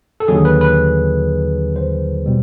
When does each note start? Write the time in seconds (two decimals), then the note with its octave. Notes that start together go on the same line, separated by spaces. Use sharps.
0.20 A4
0.28 D#2 D3 F#3 G#4
0.45 B4
0.61 B4
1.76 C5
2.26 B2 G3